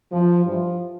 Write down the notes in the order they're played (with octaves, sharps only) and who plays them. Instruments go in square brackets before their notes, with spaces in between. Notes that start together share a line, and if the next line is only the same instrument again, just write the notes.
[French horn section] F2 E3 F3
G2 E3 F3